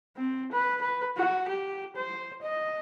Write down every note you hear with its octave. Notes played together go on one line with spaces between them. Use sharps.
C4
B4
B4
F#4
G4
C5
D#5